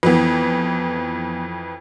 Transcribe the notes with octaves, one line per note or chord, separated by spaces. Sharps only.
F2 E3 B3 B4